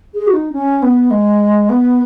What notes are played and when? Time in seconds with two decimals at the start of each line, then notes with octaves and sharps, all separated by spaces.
0.14 G#4
0.27 F#4
0.33 D#4
0.52 C#4
0.82 B3
1.11 G#3
1.70 B3